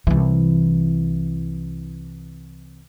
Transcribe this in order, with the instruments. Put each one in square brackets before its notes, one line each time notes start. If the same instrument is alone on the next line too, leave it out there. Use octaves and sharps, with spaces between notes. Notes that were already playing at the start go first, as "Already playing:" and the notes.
[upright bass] C2 E3